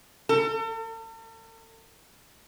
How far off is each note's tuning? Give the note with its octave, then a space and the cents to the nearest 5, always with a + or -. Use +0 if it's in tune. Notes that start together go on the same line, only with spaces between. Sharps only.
A4 +45